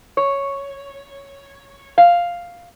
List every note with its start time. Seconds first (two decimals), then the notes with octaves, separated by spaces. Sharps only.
0.17 C#5
1.98 F5